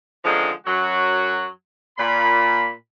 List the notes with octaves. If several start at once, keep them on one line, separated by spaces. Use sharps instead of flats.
D3 D#3 F3 G#3 C4 C#4
F#2 F#3 F#4
A#2 B5